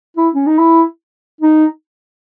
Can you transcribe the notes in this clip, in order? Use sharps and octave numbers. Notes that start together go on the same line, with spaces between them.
E4
C#4
D#4
E4
D#4